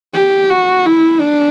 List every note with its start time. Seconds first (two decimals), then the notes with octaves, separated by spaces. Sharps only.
0.14 G4
0.50 F#4
0.86 E4
1.21 D4